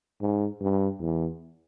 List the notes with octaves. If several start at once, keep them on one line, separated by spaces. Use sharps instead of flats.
G#2
G2
E2